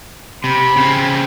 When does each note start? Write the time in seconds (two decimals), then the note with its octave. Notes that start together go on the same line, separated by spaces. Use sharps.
0.44 C3 B5
0.77 C#3 C4